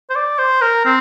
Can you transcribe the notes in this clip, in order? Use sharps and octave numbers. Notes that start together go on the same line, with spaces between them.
C5
D5
C5
A#4
C4